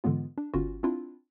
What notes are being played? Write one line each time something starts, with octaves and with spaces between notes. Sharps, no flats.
G#2 D3 E3 G#3 B3 F4
D4
G1 C#4 F4 F#4
C4 D4 E4 F4